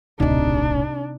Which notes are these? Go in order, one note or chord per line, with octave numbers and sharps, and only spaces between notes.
D1 B1 C3 D4 D#4